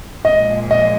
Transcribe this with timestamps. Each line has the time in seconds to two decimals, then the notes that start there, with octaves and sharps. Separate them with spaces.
0.25 A#2 F3 G#3 D#5
0.71 D#5